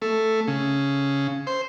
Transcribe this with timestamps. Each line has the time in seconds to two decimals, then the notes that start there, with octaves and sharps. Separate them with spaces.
0.02 A3
0.48 C#3
1.47 C5